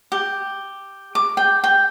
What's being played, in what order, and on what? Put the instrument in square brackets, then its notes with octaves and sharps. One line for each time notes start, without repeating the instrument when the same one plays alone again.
[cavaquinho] G4
D6
G5
G5